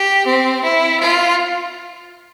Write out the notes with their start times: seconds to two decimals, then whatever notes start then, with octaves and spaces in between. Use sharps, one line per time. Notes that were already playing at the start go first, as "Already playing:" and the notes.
Already playing: G4
0.27 C4
0.63 E4
1.00 F4